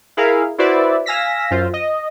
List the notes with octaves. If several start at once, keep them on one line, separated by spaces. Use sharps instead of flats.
E4 G#4 A#4 F5
E4 F#4 B4 C5 D5 E5
F5 G#5 E6 A#6 B6
F#2 F4 C5
D#5